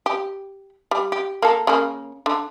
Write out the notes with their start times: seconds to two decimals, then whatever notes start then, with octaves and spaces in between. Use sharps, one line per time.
0.06 G4
0.91 G3
1.12 G4
1.42 A#3 A4
1.67 C#3 A#3
2.26 D3